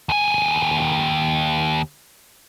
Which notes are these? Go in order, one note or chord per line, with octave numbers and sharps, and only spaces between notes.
D#2 G#5